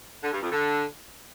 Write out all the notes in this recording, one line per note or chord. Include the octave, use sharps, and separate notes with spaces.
D3
G2
F2
D3